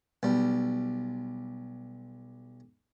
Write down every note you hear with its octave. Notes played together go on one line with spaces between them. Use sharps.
B1 G3